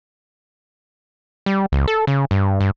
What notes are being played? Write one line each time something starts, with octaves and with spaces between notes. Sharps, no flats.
G3
C#2
A4
C#3
G2
G2